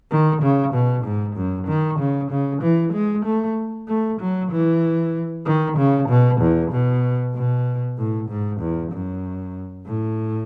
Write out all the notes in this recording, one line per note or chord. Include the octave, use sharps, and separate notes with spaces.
D#3
C#3
B2
G#2
F#2
D#3
C#3
C#3
E3
G#3
A3
A3
F#3
E3
D#3
C#3
B2
E2
B2
B2
A2
G#2
E2
F#2
A2